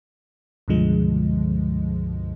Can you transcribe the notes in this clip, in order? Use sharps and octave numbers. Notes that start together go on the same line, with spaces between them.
C#2 G2 B2 D3 F3 G#3